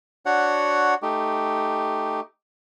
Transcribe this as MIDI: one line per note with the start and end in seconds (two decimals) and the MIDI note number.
0.26 0.94 62
0.26 0.94 66
0.26 0.94 73
0.26 0.94 78
1.02 2.20 57
1.02 2.20 63
1.02 2.20 67